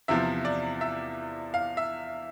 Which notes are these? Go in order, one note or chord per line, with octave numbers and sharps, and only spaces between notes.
E2 C3 F3 E5
D5
E5
F5
E5